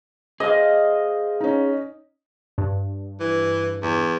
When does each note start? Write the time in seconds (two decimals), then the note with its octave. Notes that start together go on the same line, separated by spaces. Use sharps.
0.40 G#4 C5 D#5 F5
1.41 C#4 D#4
2.58 G2
3.20 E3
3.83 E2